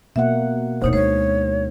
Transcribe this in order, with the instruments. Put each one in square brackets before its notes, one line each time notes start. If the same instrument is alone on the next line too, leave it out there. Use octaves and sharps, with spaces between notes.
[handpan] B2 A#3 F#5 [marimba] E5
[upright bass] F1 A#2 [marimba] D2 D#4 C#5 [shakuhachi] C5
[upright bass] G#3 [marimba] C5 [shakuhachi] C#5